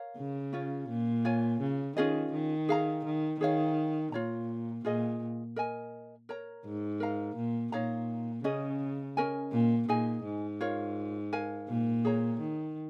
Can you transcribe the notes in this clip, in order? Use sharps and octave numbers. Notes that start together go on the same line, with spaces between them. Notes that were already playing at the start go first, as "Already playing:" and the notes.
Already playing: A#4 C#5 F5
C#3
C#4 F4 C#5
A#2
F4 C#5 G#5
C#3
D#3 C#4 F4 G#4 D#5
D#3
G#4 F5 A#5
D#3
D#3 G#4 C#5 F5
A#2 F4 C#5 A#5
A#2 F4 G#4 D#5
A#4 D#5 G#5
A#4 C#5 A#5
G#2
A#4 F5 A#5
A#2
A#2 D#4 C#5 F5 A#5
C#3 C#4 G#4 D#5
C#4 A#4 D#5 G#5
A#2
A#2 D#4 G#4 D#5 G#5
G#2
F4 A#4 C#5 F5
A#4 F5 G#5
A#2
G#4 C#5 A#5
D#3